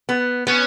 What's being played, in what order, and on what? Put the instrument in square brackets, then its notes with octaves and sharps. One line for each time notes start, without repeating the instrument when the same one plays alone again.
[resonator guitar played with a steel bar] B3
[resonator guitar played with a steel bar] B3 [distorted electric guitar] C#4